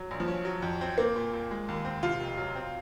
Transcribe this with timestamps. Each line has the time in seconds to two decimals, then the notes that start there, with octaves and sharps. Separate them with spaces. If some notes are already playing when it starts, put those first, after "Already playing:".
Already playing: F#3
0.11 A#1
0.20 F3
0.28 C#4
0.45 F#3
0.62 F2
0.81 C4
0.98 A#3 C4
1.16 A#2
1.33 A#2
1.51 G#3
1.68 D#2
1.85 C4
2.03 C3 F4
2.20 F1
2.37 F#3
2.56 C4